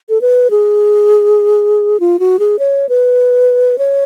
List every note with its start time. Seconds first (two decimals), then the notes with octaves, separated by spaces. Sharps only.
0.09 A4
0.21 B4
0.51 G#4
2.00 F4
2.19 F#4
2.39 G#4
2.59 C#5
2.89 B4
3.78 C#5